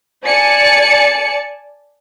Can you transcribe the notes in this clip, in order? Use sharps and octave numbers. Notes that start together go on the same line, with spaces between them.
D5 G#5 A5 C#7